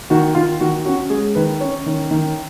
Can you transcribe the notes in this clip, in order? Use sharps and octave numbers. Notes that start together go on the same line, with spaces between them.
D#3 F#4
D#3 F4
D#3 F#4
C#4 F#4
G#3 G#4
D#3 B4
C#4 C#5
D#3
D#3